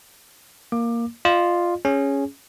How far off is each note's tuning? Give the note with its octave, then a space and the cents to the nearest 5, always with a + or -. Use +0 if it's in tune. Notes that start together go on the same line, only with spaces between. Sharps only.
A#3 +0 D6 +20
F4 +0 D#5 -45
C#4 +0 G#4 +0